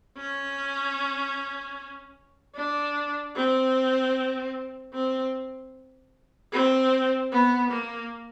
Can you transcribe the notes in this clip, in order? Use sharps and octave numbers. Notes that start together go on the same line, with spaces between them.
C#4
D4
C4
C4
C4
B3
A#3